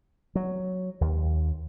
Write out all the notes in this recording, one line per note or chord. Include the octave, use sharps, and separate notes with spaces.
F#3
D#2